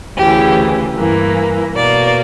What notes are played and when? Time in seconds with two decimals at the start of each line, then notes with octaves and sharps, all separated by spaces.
0.17 D2 C#3 E3 G4
0.96 G2 E3 A#3
1.75 B2 A#3 D5